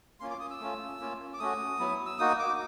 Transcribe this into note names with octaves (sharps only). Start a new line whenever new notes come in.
A#3 C#4 F4 C6
D6
D#6
E6
A3 C#4 F4
A#3 C#4 F4
D6
A3 C#4 F#4 D#6
F#3 B3 E4
E6
A#3 D#4 F#4 D#6
D6